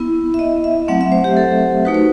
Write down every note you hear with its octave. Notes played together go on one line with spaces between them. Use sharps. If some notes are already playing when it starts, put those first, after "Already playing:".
Already playing: B3 E4
E5
D#5
E5
F#3 A3 C4 F#5
E5
C5
G4
A4
A3 D#4 F#4 B4
C5